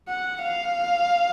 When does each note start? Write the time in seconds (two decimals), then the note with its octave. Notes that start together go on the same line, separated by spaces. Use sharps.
0.08 F#5
0.43 F5